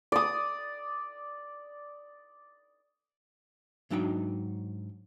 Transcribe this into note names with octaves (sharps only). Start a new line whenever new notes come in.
D5 D#6
G#2 F#3 D4 D#4 G5